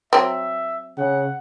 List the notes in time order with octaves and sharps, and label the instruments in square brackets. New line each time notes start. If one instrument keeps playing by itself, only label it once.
[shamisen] F#3 C4 [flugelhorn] E5
[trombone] C#3 [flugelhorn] F#5